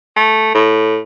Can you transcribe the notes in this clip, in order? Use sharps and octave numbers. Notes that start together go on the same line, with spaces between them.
A3
A2